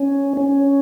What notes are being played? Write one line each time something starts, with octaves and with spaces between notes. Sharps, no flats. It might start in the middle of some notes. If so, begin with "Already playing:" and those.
Already playing: C#4
C#4